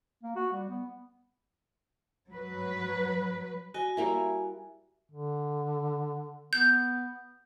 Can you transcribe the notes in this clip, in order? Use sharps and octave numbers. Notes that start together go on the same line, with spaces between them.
A#3
F#4
G3
B3
F#3 B4
F#4 D#5 G#5
G3 A#3 E4
D3
B3 G6